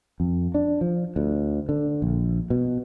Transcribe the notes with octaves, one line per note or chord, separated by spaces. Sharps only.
F2
D4
F3
D2
D3
A#1
B2